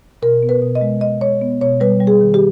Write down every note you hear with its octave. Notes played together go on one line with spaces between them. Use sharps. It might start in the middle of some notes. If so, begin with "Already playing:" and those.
B2 A#4
B3
B4
B2
D#5
G#3
B3 D#5
G#3 C#5
B3
B2 C#5
G3 B4
G3
G#4
D#3
G4